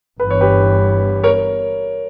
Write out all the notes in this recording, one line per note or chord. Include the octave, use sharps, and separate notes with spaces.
G1 G2 E3 B3 B4
C#5
G4 B4
A#4 C#5